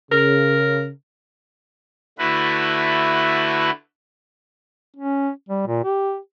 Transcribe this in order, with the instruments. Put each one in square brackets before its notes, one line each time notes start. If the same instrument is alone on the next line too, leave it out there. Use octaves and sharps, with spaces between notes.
[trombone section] C#3 [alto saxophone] A#4
[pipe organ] D3 A3 E4 F#4 B4
[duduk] C#4
G3
A#2
G4